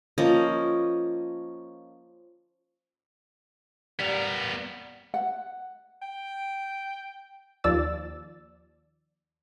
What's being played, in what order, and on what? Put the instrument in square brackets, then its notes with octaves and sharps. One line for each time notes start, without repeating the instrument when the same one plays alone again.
[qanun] F3 A#3 C#4 D#5
[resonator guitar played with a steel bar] G3 [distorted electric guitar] B3 A#4
[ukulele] F#5
[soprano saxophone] G5
[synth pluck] D#2 F3 D5 E6 A6